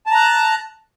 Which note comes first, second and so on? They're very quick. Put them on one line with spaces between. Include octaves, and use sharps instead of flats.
A5 A#5 F#6